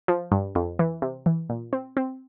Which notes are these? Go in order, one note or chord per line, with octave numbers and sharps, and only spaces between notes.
F3
G2
F2
E3
C3
E3
A#2
C4
C4